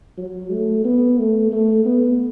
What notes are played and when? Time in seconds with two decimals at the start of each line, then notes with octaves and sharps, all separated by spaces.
0.18 F#3
0.51 A3
0.84 B3
1.18 A3
1.52 A3
1.85 B3